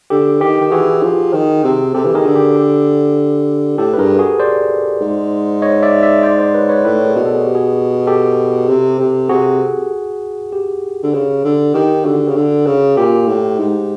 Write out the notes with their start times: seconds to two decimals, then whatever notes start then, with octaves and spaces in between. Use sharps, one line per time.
0.10 D3 G4 A4
0.41 D#3 G4
0.61 D#3
0.72 E3 F#4 G#4
1.03 F3
1.33 D#3
1.64 C3
1.94 C3 G4 A4
2.06 E3
2.15 D#3 G#4 A#4
2.26 D3
2.35 G4
2.56 G4
3.78 A2 G4 A4
3.94 B4
3.98 G2 G#4 A#4
4.19 F#4 G#4
4.40 C5 D5
5.00 G#2
5.62 C#5 D#5
5.82 D5 E5
6.03 D5 E5
6.23 C5 D5
6.38 C5 D5
6.54 B4 C#5
6.69 B4 C#5
6.85 A2 A4 B4
7.05 G#4 A#4
7.16 B2
7.26 A4
7.35 G#4
7.45 G4
7.55 F#4 G#4
8.07 G4 A4
8.68 C3
9.00 C3
9.29 C3 F#4 G#4
10.53 G4
11.03 D3
11.14 C#3
11.45 D3
11.74 D#3 G4
12.05 D3 F#4
12.28 C#3
12.36 D3
12.67 C#3
12.97 A#2 G4
13.28 A2
13.59 G#2